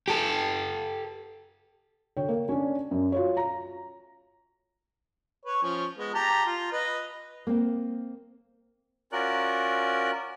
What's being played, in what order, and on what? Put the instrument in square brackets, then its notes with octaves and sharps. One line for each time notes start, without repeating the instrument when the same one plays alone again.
[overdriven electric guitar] G4 A4
[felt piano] D3 C#5 G5
A#3
C#4 D4
F#2
F4 F#4 C#5
A#5
[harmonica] B4 C#5
F3 C#4
G#3 B3
G4 A5 A#5
F4
B4 D#5
[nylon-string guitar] A#3 C4
[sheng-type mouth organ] C#4 F4 F#4 A#4 D5 F#6